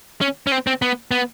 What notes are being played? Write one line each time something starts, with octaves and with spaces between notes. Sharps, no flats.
C#4
C#4
C4
C4
B3
B3